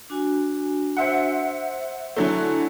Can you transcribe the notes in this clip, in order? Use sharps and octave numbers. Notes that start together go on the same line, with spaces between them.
D4 F#4 G#5
C5 E5 F#5
D3 F#3 A3 E4 G#5